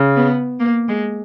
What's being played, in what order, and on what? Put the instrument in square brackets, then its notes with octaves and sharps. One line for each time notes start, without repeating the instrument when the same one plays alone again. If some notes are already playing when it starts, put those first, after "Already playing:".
Already playing: [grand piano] C#3
[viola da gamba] B3
A#3
G#3